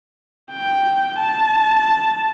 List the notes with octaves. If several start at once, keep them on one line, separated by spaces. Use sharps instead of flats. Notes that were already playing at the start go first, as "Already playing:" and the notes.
G5
A5